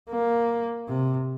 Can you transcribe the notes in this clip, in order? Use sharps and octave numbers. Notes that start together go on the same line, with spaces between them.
A#3
C3